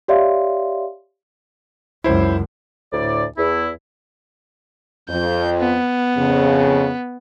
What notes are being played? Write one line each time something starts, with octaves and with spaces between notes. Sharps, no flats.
G4 C#5 D5 E5 F5 C6
C#2 F#2 E4 C5
D2 A2 D5
E2 E4
F2 G6
B3
F2 C#3